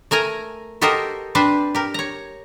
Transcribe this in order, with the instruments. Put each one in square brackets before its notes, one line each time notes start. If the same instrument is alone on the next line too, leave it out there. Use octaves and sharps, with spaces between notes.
[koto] A3 A#4 G#5 A#5
F#4 G4 A4 A#4 C5 D#5
C4 D4 B4 C5
G4 A#4
C#5 A#5